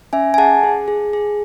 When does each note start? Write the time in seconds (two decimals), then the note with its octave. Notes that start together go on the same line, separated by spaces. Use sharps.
0.13 C#4 E5 G#5
0.34 G#5
0.38 G#4 F#5 A5
0.64 G#4
0.88 G#4
1.13 G#4